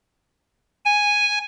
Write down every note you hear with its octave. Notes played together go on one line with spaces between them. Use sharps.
G#5